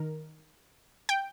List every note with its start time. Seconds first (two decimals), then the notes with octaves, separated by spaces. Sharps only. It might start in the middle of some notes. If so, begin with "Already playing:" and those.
Already playing: D#3 A#4
1.09 G5